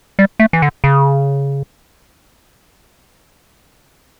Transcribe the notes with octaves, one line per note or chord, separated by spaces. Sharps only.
G3
A3
E3
D3
C#3